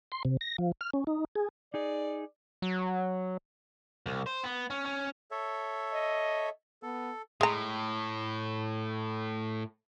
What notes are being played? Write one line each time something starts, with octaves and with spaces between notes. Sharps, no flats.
C6
C3
A#6
F3
F6
C#4
D#4
G#4
D#4 G#4 D5
F#3
C2
C5
B3
C#4
C#4
A4 C#5 E5
D#5
B3 A4
A2 G#3 A#5